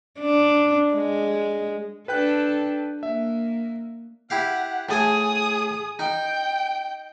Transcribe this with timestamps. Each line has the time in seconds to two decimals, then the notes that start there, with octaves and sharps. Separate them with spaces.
0.19 D4
0.95 G#3
2.08 D4 A4 B4 G5 F#6
3.03 A#3 E5
4.30 E4 G4 F5 F#5
4.89 A2 G#4 A4 G#5 D#6
5.99 D#4 G5